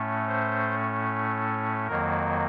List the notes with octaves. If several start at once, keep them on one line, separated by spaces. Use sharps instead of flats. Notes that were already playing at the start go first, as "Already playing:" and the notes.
Already playing: A2 A3 C#4
C5
F2 D#3 F#3 A#3 A#4